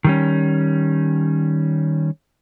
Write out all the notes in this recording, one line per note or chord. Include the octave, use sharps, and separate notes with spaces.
D#3 G3 C#4